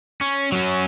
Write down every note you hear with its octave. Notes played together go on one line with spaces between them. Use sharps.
C#4
F#3 C#4